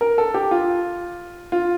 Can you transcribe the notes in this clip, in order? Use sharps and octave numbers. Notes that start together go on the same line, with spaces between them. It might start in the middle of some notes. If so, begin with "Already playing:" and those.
A#4
A4
G4
F4
F4